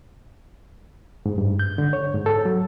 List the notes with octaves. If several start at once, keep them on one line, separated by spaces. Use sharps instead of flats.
G#2
G2
G6
D3
C#5
G#2
A4
F#3